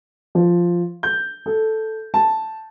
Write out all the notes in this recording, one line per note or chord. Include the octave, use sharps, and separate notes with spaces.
F3
G6
A4
A5